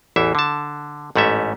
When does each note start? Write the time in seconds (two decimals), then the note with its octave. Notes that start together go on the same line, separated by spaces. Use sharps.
0.16 A1 E2 E3 E5
0.35 D3 A5
1.16 A1 G#2 A3 C#4 E5